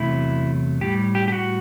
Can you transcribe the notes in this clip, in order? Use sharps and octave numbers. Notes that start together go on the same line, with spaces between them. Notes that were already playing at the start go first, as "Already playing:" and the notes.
Already playing: E2 C3 F#3 A3 E4
A2 G3 G4
G4
G4
F#4